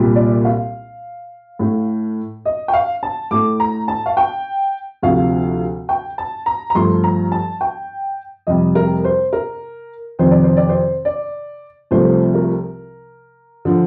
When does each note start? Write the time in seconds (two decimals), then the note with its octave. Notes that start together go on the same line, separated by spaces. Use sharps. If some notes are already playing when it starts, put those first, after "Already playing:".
Already playing: C2 A#2 G3
0.16 D5
0.45 F5
1.59 A2 A3
2.46 D#5
2.68 G5
2.73 F5
3.03 A5
3.31 A2 A3 D6
3.60 A#5
3.88 A5
4.06 F5
4.17 G5
5.02 D2 C3 F3 F5
5.89 G5
6.18 A5
6.46 A#5
6.70 A#5
6.75 G2 F3 A3 C6
7.04 A#5
7.32 A5
7.61 G5
8.47 F2 C3 G3 D#5
8.75 A#4
9.04 C5
9.33 A#4
10.19 F2 C3 D#3 C5
10.31 D5
10.44 C5
10.57 D5
10.69 C5
11.05 D5
11.91 C2 C3 F3 A3 C5
12.34 A#4
13.65 D3 F3